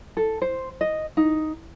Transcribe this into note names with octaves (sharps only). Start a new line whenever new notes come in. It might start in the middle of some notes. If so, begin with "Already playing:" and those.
A4
C5
D#5
D#4